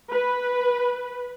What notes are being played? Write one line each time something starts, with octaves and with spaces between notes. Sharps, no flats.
B4